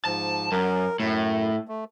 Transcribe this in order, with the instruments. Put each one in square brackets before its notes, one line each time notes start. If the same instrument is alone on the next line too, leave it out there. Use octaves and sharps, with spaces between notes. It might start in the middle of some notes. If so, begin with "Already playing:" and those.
[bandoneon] G#2 F3 [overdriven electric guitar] A5
[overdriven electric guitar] F#2 [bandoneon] A#4
[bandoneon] F#2 [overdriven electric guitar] A2
[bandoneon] A3